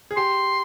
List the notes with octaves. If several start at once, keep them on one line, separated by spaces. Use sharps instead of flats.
G#4
G4 C6